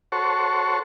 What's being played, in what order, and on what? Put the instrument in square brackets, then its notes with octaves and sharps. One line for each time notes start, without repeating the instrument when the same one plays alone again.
[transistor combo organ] F#4 A4 C5 C#5 C#6